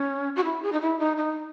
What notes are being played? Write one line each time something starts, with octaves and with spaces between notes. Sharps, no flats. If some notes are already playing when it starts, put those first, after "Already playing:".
Already playing: C#4
F#4
E4
G#4
D#4
E4
D#4
D#4